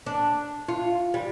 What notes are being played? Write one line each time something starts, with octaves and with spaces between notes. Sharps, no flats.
D4
F4
G3